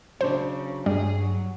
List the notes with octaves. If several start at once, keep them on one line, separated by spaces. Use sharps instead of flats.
C#3 F#3 D4 C5
G2 G3 G#4
F#3